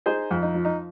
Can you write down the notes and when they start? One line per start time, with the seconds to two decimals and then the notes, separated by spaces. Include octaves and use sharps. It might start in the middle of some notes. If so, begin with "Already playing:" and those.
0.06 D#4 G#4 C5
0.31 F2
0.42 D#4
0.55 F3
0.65 D#4